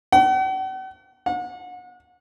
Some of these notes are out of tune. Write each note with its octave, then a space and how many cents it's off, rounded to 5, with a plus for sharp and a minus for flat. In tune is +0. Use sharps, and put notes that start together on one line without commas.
F#5 +45
F#5 -35